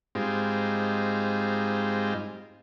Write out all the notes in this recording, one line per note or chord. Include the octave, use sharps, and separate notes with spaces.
G#2 G3 G#3 C4 D#4 F4